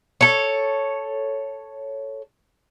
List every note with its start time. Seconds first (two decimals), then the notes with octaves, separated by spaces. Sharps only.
0.21 A4 C#5